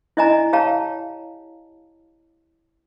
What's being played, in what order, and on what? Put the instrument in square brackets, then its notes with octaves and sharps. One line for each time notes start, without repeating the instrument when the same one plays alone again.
[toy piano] E4 D5 D#5 G#5 A#5
G4 C#5 F5 A5 A#5